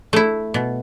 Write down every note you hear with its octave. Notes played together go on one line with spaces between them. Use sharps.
A3 E4
B2